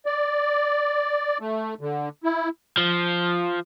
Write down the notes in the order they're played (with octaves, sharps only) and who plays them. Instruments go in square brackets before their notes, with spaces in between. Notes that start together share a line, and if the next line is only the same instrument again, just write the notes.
[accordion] D5
A3
D3
E4
[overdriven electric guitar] F3